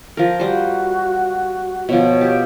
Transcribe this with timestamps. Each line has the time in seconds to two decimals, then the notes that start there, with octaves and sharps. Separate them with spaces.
0.17 F3 A#4
0.40 G3 F#4 C5
1.89 B2 F3 C#5
2.21 G4